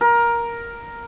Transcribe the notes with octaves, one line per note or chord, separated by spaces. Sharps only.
A#4